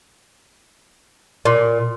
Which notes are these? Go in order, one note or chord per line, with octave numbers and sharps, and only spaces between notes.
A#2